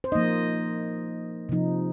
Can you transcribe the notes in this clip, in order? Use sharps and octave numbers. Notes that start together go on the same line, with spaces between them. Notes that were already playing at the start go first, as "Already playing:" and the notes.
C5
F3 A#3 D#4 D#5
C3 F3 D#4